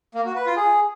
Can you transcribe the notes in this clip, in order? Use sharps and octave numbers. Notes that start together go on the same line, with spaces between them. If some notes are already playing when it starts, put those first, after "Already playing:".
A#3
F#4
B4
F4
G#4